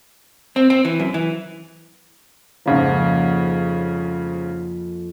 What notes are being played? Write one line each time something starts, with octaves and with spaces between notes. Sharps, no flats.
C4
C4
E3
F#2
E3
F2 G#2 C#3 F3 A#3